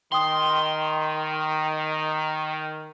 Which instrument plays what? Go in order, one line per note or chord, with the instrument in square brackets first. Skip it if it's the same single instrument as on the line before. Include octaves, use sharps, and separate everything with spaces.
[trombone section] D#3 [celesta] G5 D#6 [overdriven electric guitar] C6